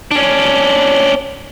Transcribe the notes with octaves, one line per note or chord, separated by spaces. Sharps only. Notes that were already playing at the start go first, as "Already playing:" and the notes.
C#4 D4